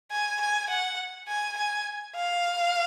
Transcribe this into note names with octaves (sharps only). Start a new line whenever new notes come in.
G#5
G#5
F#5
G#5
G#5
F5